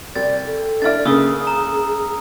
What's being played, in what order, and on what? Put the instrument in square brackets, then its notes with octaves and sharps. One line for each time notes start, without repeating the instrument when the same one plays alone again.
[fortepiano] C2 [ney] D5 [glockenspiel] A6
[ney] A4
[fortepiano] D4 E4 D5 [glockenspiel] F6 A6
[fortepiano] C#3 A#3 [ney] G#4 [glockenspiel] D#6 E6 G7
[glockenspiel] A#5